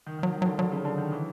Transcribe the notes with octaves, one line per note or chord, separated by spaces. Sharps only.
D#3
D#3 F#3
D#3
D3 F#3
D3 F#3
C#3
D3
D#3
E3